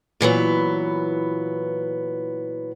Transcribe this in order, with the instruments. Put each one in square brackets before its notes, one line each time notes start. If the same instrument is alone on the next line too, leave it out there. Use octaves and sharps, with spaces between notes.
[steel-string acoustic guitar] A#2 E3 F#3 B3